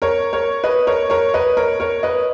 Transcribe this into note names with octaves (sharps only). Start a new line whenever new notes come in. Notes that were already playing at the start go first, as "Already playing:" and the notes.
A#4 C#5
A#4 C#5
B4 D#5
A#4 C#5
A#4 C#5
B4 D#5
A#4 C#5
A#4 C#5
B4 D#5